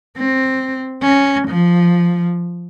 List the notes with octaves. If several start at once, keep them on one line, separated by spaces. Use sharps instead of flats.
C4
C#4
F3